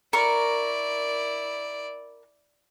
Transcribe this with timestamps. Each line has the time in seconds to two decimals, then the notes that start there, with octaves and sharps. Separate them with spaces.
0.13 E4 A#4 D5 C#6